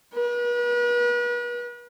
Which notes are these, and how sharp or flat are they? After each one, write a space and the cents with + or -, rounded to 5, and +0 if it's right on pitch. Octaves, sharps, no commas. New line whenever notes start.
B4 -40